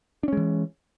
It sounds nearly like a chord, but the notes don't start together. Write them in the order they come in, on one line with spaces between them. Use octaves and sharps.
D4 C#4 G#3 E3